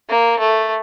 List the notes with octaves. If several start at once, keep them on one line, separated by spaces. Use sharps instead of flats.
A#3
A3